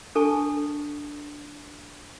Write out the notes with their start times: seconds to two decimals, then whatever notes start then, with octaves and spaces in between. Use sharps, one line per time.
0.15 D4 A4 G#5 A5 C#6